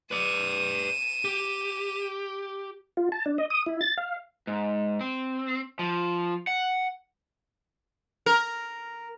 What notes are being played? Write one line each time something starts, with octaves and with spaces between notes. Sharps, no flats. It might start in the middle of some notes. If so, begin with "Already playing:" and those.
B4 D5 D#7 E7
G4
F4
A5
D4
D#5
D#6
E4
A6
F5
G#2
C4
F3
F#5
A#4